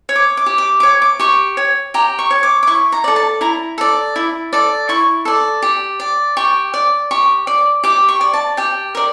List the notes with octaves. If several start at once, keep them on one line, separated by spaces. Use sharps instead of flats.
C#5
D6
D6
G4
D6
C#5 D6
D6
G4 C#6
C#5
G4 A#5
C#6
C#5
D6
D6
E4 C#6
A#5
A4 D5
A5
E4 A#5
A4 D5
E4
A4 D5
E4 C#6
A4 D5
G4
D5
G4 C#6
D5
G4 C#6
D5
G4 D6
C#6
D5
A5
G4 G5
A#4 D5